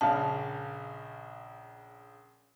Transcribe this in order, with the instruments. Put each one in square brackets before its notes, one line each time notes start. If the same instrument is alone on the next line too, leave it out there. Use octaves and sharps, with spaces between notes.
[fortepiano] A#1 C#3 F5 [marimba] A5